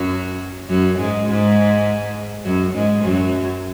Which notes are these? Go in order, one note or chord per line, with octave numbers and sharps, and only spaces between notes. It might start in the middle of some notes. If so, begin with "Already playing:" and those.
Already playing: F#2 F#3
F#2 F#3
G#2 G#3
G#2 G#3
F#2 F#3
G#2 G#3
F#2 F#3